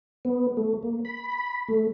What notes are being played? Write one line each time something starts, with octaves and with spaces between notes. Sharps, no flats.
B3
A3
A#3
B5
A3